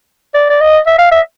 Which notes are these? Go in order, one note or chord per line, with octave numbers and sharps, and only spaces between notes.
D5
D5
D#5
E5
F5
E5